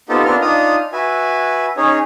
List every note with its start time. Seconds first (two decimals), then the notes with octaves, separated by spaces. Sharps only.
0.09 B3 C4 D#4 F4 G4 A4
0.25 B3 C4 D4 F4 A#4 F6
0.41 D4 D#4 F4 D#6 F6
0.93 F#4 B4 E5 G#5
1.77 C#4 D#4 G#4 C#5